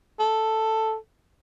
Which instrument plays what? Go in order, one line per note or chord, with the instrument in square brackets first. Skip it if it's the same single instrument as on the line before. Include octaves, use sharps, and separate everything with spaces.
[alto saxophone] A4